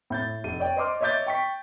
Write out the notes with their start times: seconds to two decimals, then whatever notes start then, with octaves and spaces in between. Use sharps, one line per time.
0.10 A2 G6 A6
0.44 F1 D#7
0.60 C#5 D5 G5
0.76 C5 D#5 C6 D6 F6
1.01 C#5 D#5 E5 D6 G6 A6
1.26 G5 C#6 B6